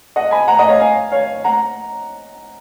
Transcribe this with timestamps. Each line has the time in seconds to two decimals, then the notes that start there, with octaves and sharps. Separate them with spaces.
0.16 D#5 F#5
0.31 G#5 B5
0.48 F#5 A#5
0.58 D#5 F#5
0.69 C#5 F5
0.79 F5 G#5
1.12 C#5 F5
1.44 F#5 A#5